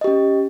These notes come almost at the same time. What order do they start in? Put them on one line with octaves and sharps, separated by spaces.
D#5 G4 C#4